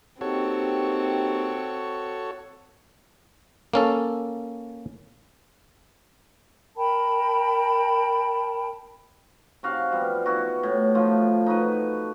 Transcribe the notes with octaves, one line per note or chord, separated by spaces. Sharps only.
A#3 C4 D#4 F#4 G4 A4 C#5
A#3 C#4 A4
A#4 G5 A5 B5
C3 F#4 F5
F3 G3 B3
B3 E4 F#4
A2
F3 A3 F4
D#4 F#4 B4